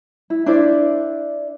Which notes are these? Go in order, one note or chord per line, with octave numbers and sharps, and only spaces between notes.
E4
D4 E4 C5 D5